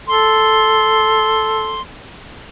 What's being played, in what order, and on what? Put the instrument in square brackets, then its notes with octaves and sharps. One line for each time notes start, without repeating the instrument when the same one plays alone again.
[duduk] A4 [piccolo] C6